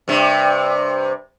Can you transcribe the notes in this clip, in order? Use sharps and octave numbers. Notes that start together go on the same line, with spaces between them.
G2 C3